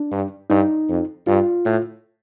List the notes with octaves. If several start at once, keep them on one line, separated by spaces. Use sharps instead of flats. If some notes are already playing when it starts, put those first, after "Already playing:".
Already playing: D4
G2
G2 D#4
F2
G2 F4
A2